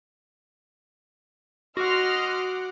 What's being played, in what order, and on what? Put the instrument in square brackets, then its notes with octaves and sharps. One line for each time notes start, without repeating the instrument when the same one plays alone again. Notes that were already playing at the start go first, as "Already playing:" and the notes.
[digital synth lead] F#4 [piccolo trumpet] D#5 [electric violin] F#5 D6 [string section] C6 F6